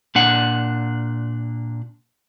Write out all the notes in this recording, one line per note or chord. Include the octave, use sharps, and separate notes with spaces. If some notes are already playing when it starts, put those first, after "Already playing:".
A#2 D4 F#5